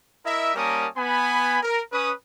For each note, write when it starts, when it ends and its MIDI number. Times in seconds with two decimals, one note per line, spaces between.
0.24 0.55 64
0.24 0.55 70
0.24 0.55 75
0.24 0.55 76
0.55 0.86 55
0.55 0.86 58
0.55 0.86 61
0.55 0.86 70
0.55 0.86 81
0.55 0.86 87
0.96 1.59 59
0.96 1.59 80
0.96 1.59 83
1.62 1.79 70
1.91 2.10 61
1.91 2.10 71
1.91 2.10 87